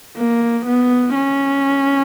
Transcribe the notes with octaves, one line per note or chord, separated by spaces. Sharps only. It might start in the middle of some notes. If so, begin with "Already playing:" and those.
A#3
B3
C#4